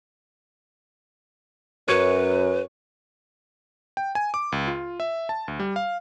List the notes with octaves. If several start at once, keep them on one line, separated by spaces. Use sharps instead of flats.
F#2 B4 C#5
G5
G#5
D6
C#2
F4
E5
A5
D2
G3
F5